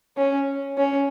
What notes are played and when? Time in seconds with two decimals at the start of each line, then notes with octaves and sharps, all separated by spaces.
0.17 C#4
0.78 C#4